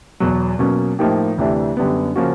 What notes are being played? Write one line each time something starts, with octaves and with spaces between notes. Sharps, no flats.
E2 B2 F#3
B2 F#3 A#3 C#4
A2 F3 A#3 D#4 G4
D2 C3 E3 A3 D4
F#2 D3 G3 B3
C#3 F3 A#3 C#4 F#4